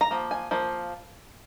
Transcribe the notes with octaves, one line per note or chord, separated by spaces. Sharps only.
A#5
F3 A#3
G#5
F3 A#3